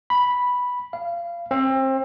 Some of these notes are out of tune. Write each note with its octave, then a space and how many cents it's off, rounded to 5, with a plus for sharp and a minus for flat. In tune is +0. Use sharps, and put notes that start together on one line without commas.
B5 -5
F5 -25
C4 +30